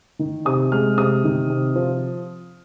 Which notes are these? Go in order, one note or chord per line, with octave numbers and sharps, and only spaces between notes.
D#3
C3 D#6
G#3 F6
C3 D#6
D#3
C3
F3